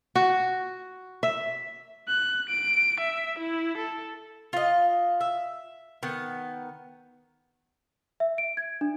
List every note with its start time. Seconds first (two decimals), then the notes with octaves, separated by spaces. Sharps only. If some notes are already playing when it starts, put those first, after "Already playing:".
0.15 F#4
1.23 E5
2.09 F#6
2.50 D7
3.00 E5
3.39 E4
3.78 A4
4.53 F4 D#5
5.21 E5
6.03 D#3 B3
8.20 E5
8.38 D7
8.57 G#6
8.81 D4